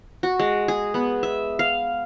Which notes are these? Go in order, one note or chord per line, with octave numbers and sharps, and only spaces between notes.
F#4
G#3
G#4
B3
E5
F5